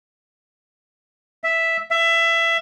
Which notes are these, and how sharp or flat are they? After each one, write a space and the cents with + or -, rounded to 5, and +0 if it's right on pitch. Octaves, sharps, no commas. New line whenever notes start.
E5 +0
E5 +20